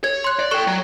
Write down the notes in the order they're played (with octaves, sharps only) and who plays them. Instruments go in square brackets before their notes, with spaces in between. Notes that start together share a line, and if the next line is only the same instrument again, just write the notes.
[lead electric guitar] C#5 [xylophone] G#6
[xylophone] C6 F#6
[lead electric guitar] D5
[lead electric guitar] A4 G5 [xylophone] C#6 F#6 E7
[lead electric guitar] F#3